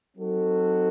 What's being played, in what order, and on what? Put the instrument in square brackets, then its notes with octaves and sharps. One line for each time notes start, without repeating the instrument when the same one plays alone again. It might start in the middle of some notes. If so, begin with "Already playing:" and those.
[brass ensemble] F#3 C4 D#4 F#4 A4